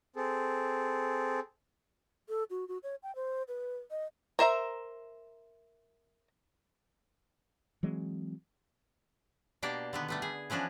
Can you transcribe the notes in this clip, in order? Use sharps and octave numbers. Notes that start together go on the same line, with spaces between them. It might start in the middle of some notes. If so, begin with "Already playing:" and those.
C4 G#4 A4
A4
F#4
F#4
C#5
G5
C5
B4
D#5
A#4 C5 E5 A#5
E3 F#3 G#3 C4
B2 A#3 D4 G4 D5
D3 D#3 B3
G3 A3 B3
G#4
E3 F3 C#4 D4 F#4